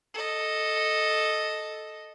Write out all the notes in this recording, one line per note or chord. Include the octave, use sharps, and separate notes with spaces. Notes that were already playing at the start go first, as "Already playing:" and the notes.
A4 D#5